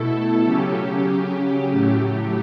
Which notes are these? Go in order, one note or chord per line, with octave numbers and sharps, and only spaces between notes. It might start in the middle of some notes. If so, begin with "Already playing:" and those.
Already playing: B2 A3 E4 A4
C#3 F#3 C#4 G4
A2 F#3 A3